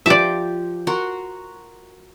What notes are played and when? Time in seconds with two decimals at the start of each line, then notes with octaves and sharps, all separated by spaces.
0.06 F3 G4 D5 E5 D6
0.87 F#4 A#4 C6